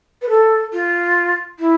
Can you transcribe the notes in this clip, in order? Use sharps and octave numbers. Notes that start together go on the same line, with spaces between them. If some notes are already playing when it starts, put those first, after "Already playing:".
B4
A4
F4
E4